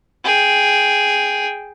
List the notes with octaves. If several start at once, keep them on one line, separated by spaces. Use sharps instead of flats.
G#4 G5